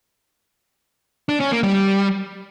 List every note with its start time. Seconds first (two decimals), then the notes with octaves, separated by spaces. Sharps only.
1.29 D4
1.40 C#4
1.52 A#3
1.63 G3